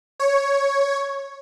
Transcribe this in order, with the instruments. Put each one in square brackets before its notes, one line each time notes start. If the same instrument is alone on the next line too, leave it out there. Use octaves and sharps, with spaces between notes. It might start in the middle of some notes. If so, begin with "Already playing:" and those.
[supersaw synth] C#5